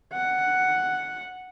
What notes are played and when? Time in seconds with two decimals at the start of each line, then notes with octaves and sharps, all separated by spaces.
0.13 F#5